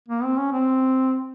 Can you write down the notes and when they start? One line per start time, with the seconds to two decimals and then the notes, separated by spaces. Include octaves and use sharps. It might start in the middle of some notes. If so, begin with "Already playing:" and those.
0.08 A#3
0.24 C4
0.38 C#4
0.52 C4